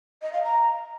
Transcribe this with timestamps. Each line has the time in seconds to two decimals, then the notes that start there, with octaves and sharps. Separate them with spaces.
0.22 D#5
0.33 F5
0.44 A#5